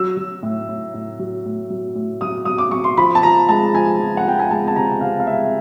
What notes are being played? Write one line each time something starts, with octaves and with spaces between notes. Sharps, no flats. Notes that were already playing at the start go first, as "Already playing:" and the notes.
Already playing: F#3 E6
F#3
A2
A2
A2
F#3
A2
F#3
A2
F#3 D#6
F#3 D#6
D6
F#3 C#6
C6
F3 B5
A5
F3 A#5
G#3 A5
F3 G#5
F3
F#5
F3 G5
G#5
G#3 A5
A5
C3 A#5
C3 F5
F5
G#3 E5